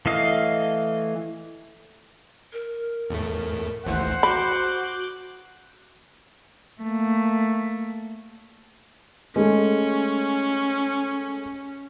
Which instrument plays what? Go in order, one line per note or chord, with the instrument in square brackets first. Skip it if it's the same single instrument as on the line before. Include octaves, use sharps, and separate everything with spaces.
[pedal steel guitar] E3 A3 D#5 F5
[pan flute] A#4
[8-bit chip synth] E2 A2 A3
[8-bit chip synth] A1 D#2 E3 [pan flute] A3 [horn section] C5 F#5
[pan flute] F#4 [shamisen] B5 [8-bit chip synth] D6 F#6 G6
[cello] A3 A#3
[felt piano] G#3 A3 [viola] C#4